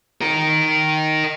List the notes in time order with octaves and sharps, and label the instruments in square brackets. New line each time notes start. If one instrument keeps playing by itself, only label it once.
[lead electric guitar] D#4 A#4